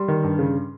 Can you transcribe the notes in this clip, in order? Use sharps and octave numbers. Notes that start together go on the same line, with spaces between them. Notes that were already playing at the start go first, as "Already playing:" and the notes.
Already playing: G3 C6
D#3
G2
C#3